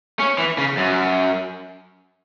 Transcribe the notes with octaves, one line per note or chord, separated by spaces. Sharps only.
C#4
E3
C#3
F#2